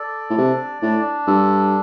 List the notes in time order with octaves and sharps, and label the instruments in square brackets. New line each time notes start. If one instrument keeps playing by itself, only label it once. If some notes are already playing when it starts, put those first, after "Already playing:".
Already playing: [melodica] A4 D5
[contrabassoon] A2
[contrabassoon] C3 [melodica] D4
[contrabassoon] A2 [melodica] D4
[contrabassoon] G2 [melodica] A4